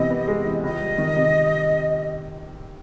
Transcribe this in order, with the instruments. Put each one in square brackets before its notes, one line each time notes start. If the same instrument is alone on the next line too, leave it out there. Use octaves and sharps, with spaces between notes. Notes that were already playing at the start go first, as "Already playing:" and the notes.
Already playing: [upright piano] C3 E3 B3 [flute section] D#5
[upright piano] B3
G#3
E3
[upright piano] C#2 [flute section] D#5
[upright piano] G3
D#3
C3